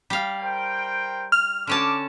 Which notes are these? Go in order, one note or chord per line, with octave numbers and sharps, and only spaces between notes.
G3 F5
A#4 C5 G5
F6
D3 C#4 A5 D6